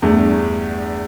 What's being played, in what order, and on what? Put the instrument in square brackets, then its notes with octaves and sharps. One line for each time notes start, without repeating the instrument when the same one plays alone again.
[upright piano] E2 G2 A3